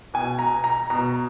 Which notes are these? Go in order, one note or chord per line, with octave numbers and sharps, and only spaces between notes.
B2 G#5
A#5
A#5
B2 A#5